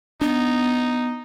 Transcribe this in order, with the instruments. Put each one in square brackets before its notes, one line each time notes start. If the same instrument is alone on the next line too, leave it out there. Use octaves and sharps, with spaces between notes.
[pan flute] B3 [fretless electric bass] D4 [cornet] D#4